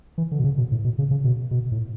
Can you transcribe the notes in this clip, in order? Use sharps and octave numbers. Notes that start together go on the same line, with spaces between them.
E3
D3
B2
C#3
B2
A2
B2
C#3
C#3
B2
B2
A2